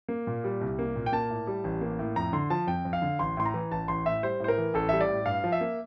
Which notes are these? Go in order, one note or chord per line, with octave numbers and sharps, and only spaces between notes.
A#3
A#2
G3
C2
A#3
A#2
G5
A#3 A5
A2
G3
A1
A#3
A2
F2 A#5
D3 C6
F3 A5
F2 G5
F2
F5
D3
A1 C6
A2 C6
A#5
E3
A1 A5
A1 C6
A2 E5
G3 C5
A2 C5
A#4
E3
A1 A4
G3 E5
D5
A2
G2 F5
F3
E5
A#3